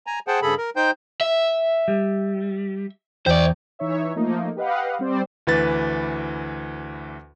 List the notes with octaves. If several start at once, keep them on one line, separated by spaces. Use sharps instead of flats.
G#5 A#5
G#4 C5 F#5 G5 A5
G2 C#3 G#4 A4 B5
A#4
D#4 C5 G5 G6
E5
G3
E2 C5 D5 G5
E3 D#4 C#5 E5
F3 A3 A#3 D#4
G4 B4 D#5 F5 F#5
G3 C4 C5 D5
D2 E3 B4 A6